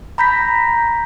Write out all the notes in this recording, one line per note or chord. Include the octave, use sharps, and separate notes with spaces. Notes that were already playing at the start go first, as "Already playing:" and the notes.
A#5 B5 G6 A#6 B6